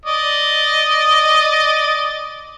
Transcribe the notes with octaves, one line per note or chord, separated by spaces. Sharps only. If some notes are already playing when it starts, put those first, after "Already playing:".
D5 D#5